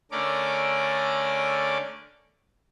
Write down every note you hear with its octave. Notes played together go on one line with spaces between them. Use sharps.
D3 A3 C#4 A#4 D5 D6